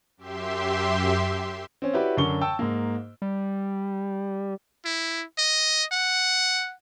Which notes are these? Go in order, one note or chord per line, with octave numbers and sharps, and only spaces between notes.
F#2 G4 E5 C6
C4 C#4
E4 F#4 G4 B4 C#5 D5
F#2 D3 A#4 C#6 G7
G5 A5 C#6 E6
G#2 A#3
G3
E4
D#5
F#5